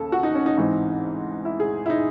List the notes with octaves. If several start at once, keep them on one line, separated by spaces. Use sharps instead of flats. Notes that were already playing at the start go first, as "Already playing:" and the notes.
Already playing: D#2 C#3 A4
F#4
D#4
C#4
D#4
A1 G#2 E3 C4 D#4
E4
G#4
E4
D#4